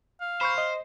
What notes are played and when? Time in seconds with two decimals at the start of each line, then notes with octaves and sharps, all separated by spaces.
0.21 F5
0.41 C5 B5 C#6 G6
0.58 D#5